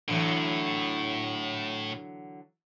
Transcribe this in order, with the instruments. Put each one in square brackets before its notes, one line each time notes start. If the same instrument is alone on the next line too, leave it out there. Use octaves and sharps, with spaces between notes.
[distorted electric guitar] A2 [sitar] D3 E3 F#3